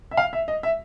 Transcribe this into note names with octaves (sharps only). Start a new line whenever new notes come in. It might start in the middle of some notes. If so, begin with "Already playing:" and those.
E5
F5
E5
D#5
E5